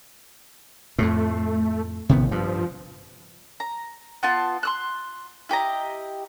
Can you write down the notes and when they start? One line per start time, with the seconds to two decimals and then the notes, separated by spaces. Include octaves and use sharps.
0.99 F2 A2 A3
2.09 A1 C3 D#3 B3
2.31 G2 F3
3.60 A#5
4.23 B3 F4 A5
4.63 C6 E6 F#6
5.49 E4 G4 D#5 A#5